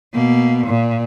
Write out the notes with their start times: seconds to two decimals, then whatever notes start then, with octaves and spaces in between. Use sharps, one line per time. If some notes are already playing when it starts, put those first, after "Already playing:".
0.13 B2 A#3
0.66 A#2